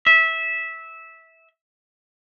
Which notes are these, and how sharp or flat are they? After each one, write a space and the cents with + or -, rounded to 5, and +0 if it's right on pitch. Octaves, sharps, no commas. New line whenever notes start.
E5 -15